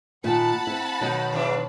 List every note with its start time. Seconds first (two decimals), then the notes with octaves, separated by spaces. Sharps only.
0.24 A#2 D#3 F#5 A5 B5
0.67 C4 E4
1.01 B2 D#3 F#3 D#4
1.32 G#2 E3 D4